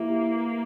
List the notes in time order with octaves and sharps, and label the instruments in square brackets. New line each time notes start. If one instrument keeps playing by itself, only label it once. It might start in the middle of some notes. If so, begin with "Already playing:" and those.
Already playing: [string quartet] A#3 [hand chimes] E4 G4 B4 E5